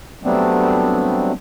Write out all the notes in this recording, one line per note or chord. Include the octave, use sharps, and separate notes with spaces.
F#3 G3 A3 B3 C4 D4